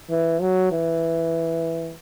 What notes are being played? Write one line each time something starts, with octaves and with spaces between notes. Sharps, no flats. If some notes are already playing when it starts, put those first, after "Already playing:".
E3
F#3
E3